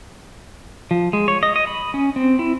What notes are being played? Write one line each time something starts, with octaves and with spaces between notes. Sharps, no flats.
F3
G#3
C#5
D#5
D#5
B5
C#4
C4
E4